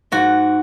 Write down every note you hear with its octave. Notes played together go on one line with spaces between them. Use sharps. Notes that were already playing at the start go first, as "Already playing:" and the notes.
G#2 F#4